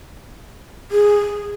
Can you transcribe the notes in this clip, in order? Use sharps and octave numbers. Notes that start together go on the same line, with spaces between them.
G#4